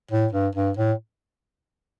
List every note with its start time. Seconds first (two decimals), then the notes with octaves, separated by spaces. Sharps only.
0.11 A2
0.32 G2
0.55 G2
0.77 A2